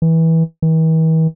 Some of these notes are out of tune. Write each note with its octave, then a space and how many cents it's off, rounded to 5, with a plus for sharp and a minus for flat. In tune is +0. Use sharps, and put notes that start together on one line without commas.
E3 -20
E3 -45